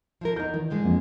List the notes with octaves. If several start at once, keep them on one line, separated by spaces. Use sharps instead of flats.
F3 E4 A#4
E2 D#4 A#4 G6
D#3 E3
G#2 D3 G#3
F2 A#3